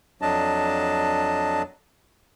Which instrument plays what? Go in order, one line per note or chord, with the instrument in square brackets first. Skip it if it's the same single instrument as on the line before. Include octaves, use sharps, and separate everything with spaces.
[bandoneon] F2 F#3 D4 D#5 A5